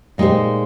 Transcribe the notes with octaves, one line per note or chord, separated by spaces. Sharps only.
A#2 G#3 D#4 G4 C5